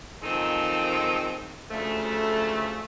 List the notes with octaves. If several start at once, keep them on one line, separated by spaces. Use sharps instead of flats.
D#3 F3 G#3 C4 D#4 A4
D2 C#3 F3 A3